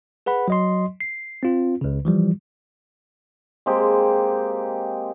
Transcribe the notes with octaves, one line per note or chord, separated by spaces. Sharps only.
G#4 B4 F#5 B5
F#3 D#5 C6
C7
C4 F4
C#2 C#3
E3 F3 G3
G#3 A#3 C4 G4